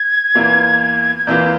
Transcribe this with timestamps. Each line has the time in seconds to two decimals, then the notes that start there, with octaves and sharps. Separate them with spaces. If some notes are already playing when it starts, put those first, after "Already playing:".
Already playing: G#6
0.35 E2 E3 A#3 F4
1.17 G#6
1.27 E2 E3 A#3 F4 G6